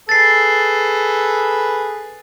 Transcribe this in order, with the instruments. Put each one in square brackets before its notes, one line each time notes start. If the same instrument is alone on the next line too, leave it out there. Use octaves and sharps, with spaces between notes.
[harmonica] G#4 A4 B4 [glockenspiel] A6 C7